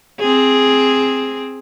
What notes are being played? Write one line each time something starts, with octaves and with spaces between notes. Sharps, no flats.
C4 G#4